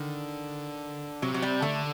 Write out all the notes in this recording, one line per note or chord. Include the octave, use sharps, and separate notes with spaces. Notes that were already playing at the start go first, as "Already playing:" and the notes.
Already playing: D3 D#3
C3 F#3
F#3
G3
D3 A3